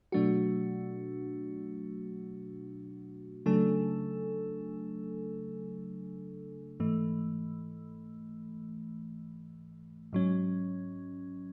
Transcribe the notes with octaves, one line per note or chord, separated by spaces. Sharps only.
B2 F#3 A3 D4 F#4
C#3 F#3 A3 D4 A4
G#2 E3 A3
G#2 F#3 C#4